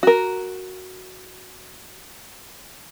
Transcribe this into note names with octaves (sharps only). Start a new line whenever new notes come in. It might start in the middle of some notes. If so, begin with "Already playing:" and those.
F#4 A#4